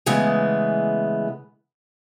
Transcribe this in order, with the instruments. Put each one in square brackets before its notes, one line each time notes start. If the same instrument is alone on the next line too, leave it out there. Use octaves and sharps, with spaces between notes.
[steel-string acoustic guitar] C#3 E3 G#3 A3 B3